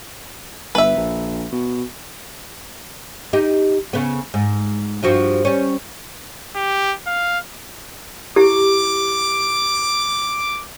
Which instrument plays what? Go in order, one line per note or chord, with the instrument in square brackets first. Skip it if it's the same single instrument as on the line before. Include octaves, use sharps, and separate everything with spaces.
[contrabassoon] G1 [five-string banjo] B4 E5
[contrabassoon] A#1
B2
[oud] D#4 G4
C#3 B3
G#2
G2 F3 F#4
G3 C#4
[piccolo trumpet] G4
F5
[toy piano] E4 G4 [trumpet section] D6